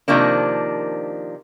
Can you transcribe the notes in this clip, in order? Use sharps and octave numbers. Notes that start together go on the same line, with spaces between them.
C3 D#3 F3 A#3 D4